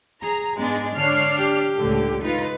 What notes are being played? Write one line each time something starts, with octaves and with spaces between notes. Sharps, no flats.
G#4 A#5
G#2 G#3 B3 D4
D3 D4 C#5 F6 C7
G4
C#2 A2 D3
D#4 F4 B4